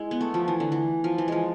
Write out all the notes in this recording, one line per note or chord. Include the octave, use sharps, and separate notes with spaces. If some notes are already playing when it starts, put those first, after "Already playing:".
Already playing: G#3 E4
B3
A3
F3
E3
D3
E3
F3
E3
F3 G#3